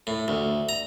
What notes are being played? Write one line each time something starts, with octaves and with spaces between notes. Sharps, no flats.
A2
D2
A#5